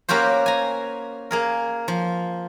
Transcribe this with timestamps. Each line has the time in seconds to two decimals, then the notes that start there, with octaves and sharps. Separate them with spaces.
0.09 A#3 C#4 F#4 G4 C5
0.46 G#5 A#5
1.31 A#3 G#4 A#4
1.88 F3